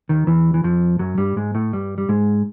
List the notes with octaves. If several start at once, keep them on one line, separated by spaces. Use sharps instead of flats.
D#2 D#3
E2 E3
E3
F2 F3
F#2 F#3
G2 G3
G#2 G#3
A2 A3
G2 G3
G3
G#2 G#3